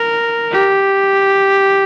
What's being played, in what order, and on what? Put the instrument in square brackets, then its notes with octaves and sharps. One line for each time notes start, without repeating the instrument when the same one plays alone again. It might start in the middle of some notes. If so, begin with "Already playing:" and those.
Already playing: [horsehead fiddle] A#4
G4